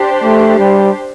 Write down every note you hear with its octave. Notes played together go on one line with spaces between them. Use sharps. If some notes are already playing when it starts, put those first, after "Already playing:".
Already playing: D4 G4 C5
A3
G3